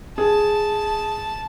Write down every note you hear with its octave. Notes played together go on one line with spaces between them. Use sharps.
G#4 A5